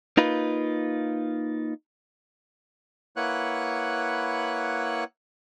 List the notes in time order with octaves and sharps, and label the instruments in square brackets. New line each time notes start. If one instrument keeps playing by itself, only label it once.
[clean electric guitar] A#3 D#4 F4 B4
[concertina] A#3 E4 B4 C#5 F#5 F#6